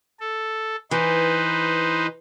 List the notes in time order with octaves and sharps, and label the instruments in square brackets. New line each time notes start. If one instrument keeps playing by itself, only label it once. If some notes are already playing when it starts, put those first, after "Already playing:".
[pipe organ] A4
[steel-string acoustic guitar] E3 [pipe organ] D#4 B4 C5